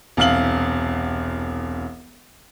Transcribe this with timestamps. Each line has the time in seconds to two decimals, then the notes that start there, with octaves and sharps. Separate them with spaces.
0.17 E1 C2 F5 F#7